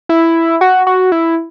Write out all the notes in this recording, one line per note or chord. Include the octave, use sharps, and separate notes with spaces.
E4
F#4
F#4
E4